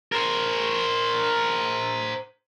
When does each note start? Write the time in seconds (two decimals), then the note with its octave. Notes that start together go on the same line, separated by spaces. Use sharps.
0.12 A#4 C5